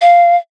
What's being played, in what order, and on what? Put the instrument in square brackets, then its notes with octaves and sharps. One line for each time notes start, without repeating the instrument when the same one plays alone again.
[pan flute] F5